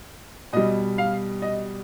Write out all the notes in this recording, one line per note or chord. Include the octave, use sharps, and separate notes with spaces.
B2 G3 D#5
F5
D#5